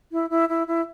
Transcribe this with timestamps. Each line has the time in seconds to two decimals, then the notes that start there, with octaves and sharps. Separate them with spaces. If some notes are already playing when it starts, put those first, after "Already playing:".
0.12 E4
0.30 E4
0.49 E4
0.67 E4